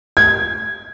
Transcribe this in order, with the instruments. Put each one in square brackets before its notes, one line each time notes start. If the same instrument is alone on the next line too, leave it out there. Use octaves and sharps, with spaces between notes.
[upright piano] G#6